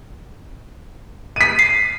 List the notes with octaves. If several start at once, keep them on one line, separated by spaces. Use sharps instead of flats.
B6 D#7
C7